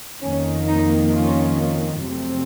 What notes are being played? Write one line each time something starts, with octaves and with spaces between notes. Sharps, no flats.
F2 D#3 A#3 C#4
D#4
C#4 F4
F2 C3 F#3 A3 C4